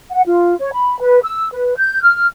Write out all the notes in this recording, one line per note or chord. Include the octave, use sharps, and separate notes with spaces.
F#5
F4
C#5
B5
B4
E6
B4
G6
F6